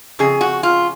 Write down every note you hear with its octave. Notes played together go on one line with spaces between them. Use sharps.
F2 C#3 G#4
F#4
F4